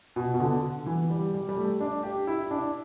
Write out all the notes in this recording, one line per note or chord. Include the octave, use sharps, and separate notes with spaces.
B2
B2
D3
E3
G3
G3
G3
A3
D4
G4
E4
D4